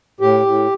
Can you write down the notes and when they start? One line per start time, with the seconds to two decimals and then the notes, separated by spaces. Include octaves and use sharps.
0.20 A2 G4
0.46 A2